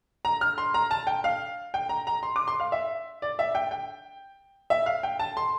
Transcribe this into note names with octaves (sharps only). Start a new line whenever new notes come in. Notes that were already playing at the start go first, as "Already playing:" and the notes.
A#5
F6
C6
A#5
A5
G5
F5
G5
A#5
A#5
C6
D6
C6
F5
E5
D5
E5
G5
G5
E5
F5
G5
A5
C6